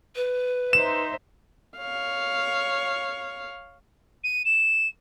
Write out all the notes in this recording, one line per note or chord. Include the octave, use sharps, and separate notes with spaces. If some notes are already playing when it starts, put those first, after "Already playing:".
B4
D#4 C5 E5 E7
C#5 F5
D#7
E7